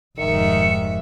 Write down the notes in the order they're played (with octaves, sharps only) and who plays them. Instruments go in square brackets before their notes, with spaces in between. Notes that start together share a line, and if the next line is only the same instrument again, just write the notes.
[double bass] F1 G#2 [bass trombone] D#3 [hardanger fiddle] E5 [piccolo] C#7